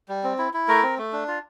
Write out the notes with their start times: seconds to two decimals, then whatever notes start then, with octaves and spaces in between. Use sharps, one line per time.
0.09 G3
0.24 C4
0.38 E4
0.54 E4
0.68 A3 A#4
0.83 C4
0.98 A3
1.13 D4
1.28 F4